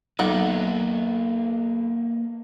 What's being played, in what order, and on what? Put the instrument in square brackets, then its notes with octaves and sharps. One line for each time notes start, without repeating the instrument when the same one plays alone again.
[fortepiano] B1 [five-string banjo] D#3 D5 F#5 [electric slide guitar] A#3 A4 B4